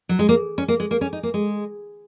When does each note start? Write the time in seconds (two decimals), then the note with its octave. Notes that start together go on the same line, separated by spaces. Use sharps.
0.09 F#3
0.19 G#3
0.29 A#3
0.58 C#4
0.68 A#3
0.80 G#3
0.91 A#3
1.01 C#4
1.13 D#4
1.23 A#3
1.34 G#3